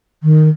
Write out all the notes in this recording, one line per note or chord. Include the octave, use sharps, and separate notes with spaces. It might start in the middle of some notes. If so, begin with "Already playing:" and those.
D#3